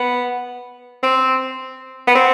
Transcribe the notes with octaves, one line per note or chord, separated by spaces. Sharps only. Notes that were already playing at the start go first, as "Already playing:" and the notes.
Already playing: B3
C4
B3
C4